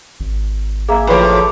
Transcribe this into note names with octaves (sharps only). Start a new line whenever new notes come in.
G#1
A#3 G#4 E5
A2 F3 B4 C#5 D5